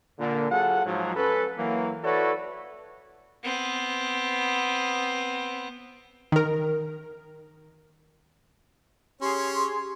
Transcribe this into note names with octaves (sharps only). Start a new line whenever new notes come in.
A#2 D3
F#3 F4 G#4 A4 F#5
G#2 F3 F#3
C#4 A4 B4
E3 F#3 A#3
E4 F#4 A4 B4 C#5 D5
B3 C4
D#3 A#4
C#4 G4 G#4 C#5 C6